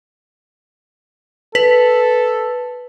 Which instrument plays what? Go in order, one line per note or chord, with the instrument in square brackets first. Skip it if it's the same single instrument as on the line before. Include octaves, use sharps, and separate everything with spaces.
[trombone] A4 [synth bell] B4